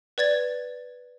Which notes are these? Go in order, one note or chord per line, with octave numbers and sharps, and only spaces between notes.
B4 D5 G#6 A6